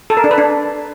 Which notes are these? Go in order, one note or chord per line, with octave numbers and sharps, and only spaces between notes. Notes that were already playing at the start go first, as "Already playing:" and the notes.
A4
A#4
D4
B4
D4